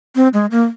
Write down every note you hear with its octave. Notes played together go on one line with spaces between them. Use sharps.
C4
G#3
A#3